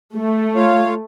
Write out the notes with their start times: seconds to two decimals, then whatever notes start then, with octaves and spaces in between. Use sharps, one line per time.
0.15 A3
0.56 F4 C#5 F5